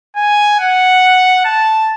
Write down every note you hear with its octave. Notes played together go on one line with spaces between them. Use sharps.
G#5
F#5
A5